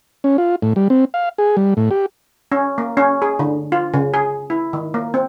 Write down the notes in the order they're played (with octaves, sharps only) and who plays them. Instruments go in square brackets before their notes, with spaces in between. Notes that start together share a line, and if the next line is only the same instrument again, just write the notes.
[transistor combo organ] C#4
F4
A2
G3
C4
F5
G#4
G3
A2
G4
[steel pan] C#4
A#3
C#4
G#4
D3
F4
C#3
G#4
E4
D#3
A#3
C4